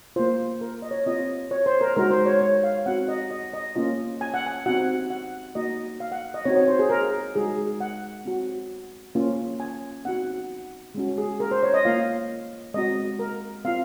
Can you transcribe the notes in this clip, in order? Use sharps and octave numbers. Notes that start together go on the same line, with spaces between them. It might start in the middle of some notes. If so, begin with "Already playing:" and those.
A#3 F4 C5
A#4
D#5
C#5
C4 F4 D#5
C#5
C5
A#4
G#3 D#4 F#4 A#4
C5
C#5
C#5
F5
C4 D#4 F#4 F#5
D#5
D#5
D#5
A#3 C#4 F4 D#5
G#5
F#5
G#5
C4 D#4 F#4 F#5
F#5
A#3 D#4 F#4 D#5
F5
F#5
D#5
C4 D#4 F#4 C#5
C#5
C5
G#4
A#4
G#3 D#4 F#4 G#4
F#5
C4 F#4
A#3 C#4 F4
G#5
C4 D#4 F#4 F#5
G#3 C#4 F#4
G#4
A#4
C5
C#5
D#5
A#3 F4 F5
G#3 C4 F#4 D#5
A#4
C4 F4 F5